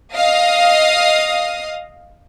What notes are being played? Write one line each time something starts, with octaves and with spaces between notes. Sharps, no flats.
D#5 F5 D#6